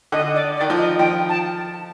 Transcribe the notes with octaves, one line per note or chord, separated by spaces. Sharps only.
D3 D#5
D5
D5
D#3
F3
D#5
F3 G5
A5